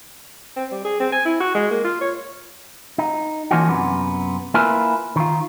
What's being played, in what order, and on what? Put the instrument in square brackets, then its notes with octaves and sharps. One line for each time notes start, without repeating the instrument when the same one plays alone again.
[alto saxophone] C4
G3
G#4
C4
G#5
E4
F#4
G#3
A#3
F4
C#5
[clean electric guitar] D#4
E3 F3 A#3 C#4 D#4 F#4
F#2 C3 B3
A#3 E4 F4 A#4 B4 G#5
D#3 F4